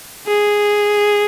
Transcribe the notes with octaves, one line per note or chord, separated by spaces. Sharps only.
G#4